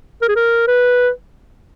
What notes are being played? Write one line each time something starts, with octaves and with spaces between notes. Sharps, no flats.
A#4
G#4
A#4
B4